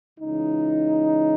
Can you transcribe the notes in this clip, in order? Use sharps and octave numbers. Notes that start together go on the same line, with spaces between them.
C#2 C#3 E3 D#4